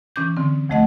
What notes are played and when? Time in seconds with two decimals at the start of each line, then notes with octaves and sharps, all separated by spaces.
0.16 E3 C#4 D6 G6
0.37 D3 C4
0.69 D2 F3 A3 D#5 F#5